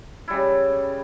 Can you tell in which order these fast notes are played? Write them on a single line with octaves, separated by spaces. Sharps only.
E4 G3 C#3